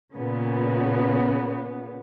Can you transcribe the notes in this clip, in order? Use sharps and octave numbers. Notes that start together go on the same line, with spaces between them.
A#2 C#3 B3